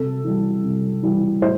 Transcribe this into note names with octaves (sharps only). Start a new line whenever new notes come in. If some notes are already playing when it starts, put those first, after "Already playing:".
Already playing: C3 A4
E3 G3
C3
E3 G3
A2 C5